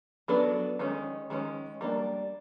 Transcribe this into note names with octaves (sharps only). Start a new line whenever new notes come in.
F#3 B3 D4 F#4 A4
D#3 G#3 C#4
D#3 G#3 C#4
G3 A#3 D4